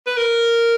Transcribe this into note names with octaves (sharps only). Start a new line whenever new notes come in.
B4
A#4